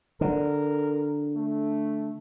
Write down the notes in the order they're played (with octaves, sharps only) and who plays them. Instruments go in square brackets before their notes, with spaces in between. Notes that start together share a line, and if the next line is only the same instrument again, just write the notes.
[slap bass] D3 [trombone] A#4
[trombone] A3